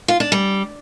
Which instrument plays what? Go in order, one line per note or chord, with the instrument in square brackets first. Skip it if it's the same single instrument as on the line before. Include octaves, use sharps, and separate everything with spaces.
[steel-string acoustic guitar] F4
D4
G3